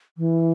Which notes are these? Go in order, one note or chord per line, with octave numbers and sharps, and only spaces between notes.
E3